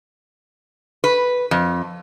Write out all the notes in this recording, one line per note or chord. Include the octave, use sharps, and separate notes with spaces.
B4
F2